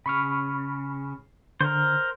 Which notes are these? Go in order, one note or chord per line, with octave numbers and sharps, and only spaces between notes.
C#3 B5 C#6 F6
D3 A#4 C5